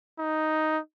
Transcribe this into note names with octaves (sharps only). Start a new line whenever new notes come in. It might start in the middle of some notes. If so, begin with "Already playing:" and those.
D#4